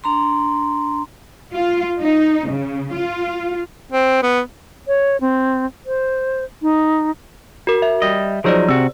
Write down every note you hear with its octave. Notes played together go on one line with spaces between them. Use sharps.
D4 A#5 C6
F4
D#4
C#3
F4
C4
B3
C#5
C4
C5
D#4
F#4 A#4
E5
G3 D#5
F3 F#3 D#4 G#4 C5 D5
C3 F#4 E6